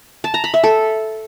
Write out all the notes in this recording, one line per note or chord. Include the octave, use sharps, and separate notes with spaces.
A5
A#5
B5
E5
A4